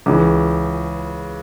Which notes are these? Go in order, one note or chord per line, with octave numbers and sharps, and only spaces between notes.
C#2 C#3 E3